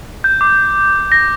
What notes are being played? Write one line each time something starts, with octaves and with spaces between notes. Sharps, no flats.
G6
D6
A#6